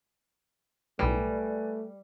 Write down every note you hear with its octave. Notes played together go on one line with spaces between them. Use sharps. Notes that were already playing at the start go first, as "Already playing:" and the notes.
B1 A2 G3 A3 B4 D5 G#5